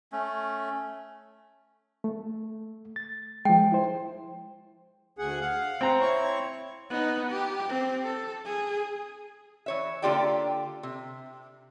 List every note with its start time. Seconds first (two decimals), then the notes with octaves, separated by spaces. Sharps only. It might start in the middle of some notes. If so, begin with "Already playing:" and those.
0.12 A3 C#4
2.04 A3
2.96 A6
3.45 F3 G#3 G5
3.72 E4 C5
5.19 D2 G#4 F#5
5.41 F5 F#5
5.81 C4 A#5
6.01 E4 C#5 C#6
6.90 B3 D#4
7.30 G4
7.69 C4
8.03 A4
8.45 G#4
9.66 E3 C#5 E5
10.02 D3 A#3 F4 G4 D5 G5
10.83 C3